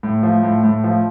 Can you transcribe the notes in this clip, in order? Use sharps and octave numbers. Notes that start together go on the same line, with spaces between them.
A2
F3
A2
A2
F3